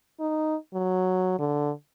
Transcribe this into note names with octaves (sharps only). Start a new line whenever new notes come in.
D#4
F#3
D3